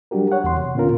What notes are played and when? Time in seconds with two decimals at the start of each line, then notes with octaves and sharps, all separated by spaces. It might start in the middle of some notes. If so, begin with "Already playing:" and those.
0.11 F#3 G3 D4 F#4 G4 A#4
0.32 C#5 F#5
0.44 E2 C6
0.56 C3
0.75 A#2 D3 B3 C#4 F4 A#4